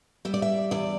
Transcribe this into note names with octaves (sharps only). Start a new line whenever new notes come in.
G3 E5
D5
E5
E2 D5